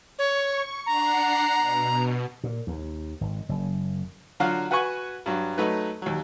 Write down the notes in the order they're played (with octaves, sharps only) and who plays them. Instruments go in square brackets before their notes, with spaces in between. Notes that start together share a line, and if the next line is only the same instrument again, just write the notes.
[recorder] C#5 [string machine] C#6
[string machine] D4 F#5 C7 [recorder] A#5
[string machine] B2
[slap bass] A#2
D#2
G#1
F#1
[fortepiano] D3 F#3 F4 F#4 F5 F6
F#4 B4 F#5 G#5 C#6
G2 F#3
F#3 A3 D#4 B4
D#2 F#3